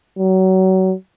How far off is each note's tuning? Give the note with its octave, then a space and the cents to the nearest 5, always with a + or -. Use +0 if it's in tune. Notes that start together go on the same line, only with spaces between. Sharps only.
F#3 +30